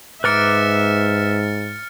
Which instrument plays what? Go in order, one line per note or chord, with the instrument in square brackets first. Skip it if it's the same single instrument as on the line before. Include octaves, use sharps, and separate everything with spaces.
[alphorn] G#2 [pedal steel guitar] B4 A#5 D6 [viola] E5 [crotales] F6 A6 C#7